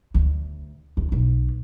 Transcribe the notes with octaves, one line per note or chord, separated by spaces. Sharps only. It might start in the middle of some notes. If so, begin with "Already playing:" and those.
D2
C#2
B1